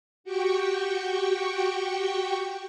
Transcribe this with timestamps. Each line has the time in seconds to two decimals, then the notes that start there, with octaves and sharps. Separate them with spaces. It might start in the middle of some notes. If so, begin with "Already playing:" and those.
0.24 F#4 G4 G5 C#6